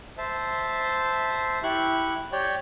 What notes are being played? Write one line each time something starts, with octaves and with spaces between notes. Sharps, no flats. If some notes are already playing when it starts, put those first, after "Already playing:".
C5 E5 A5
E4 G4 C#6 F#6
G4 C#5 D5 G5